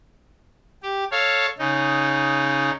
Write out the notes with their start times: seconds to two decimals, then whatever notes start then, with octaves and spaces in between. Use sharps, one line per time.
0.83 G4
1.12 A4 C#5 F5
1.59 C#3 D#4